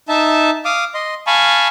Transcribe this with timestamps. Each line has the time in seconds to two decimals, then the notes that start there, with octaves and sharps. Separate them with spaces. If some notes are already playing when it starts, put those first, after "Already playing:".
0.09 D#4 E5 A5
0.65 F5 D6 D#6
0.94 D#5 C6
1.27 F5 G#5 A5 B5 C#6